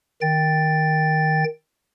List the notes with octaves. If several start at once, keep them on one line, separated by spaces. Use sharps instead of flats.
D#3 G5 A6